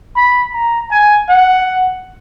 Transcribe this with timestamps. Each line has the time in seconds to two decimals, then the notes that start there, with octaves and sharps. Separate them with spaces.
0.16 B5
0.54 A#5
0.91 G#5
1.29 F#5